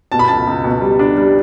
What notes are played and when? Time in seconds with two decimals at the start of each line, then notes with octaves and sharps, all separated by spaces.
0.12 B2 A5
0.19 B5
0.28 C#2 A5
0.47 C#2
0.64 B2
0.81 G3
0.99 D4
1.17 G3